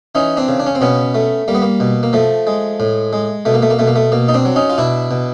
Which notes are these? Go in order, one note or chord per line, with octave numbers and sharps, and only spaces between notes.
E3 C#4 D#4
C4 D4
C#3
D4
C#4
C4
B2 B3 C#4
A3
G3 A#3
B3
A#3
B2
A#3
F3 A3
G#3
A2
G#3
B2 A3
A#3
A3
A#3
B2 A3
A#3
A3
B2 A#3
D#4
C4 D4
F#3
C#4 D#4
F4
B2 D4 E4
B2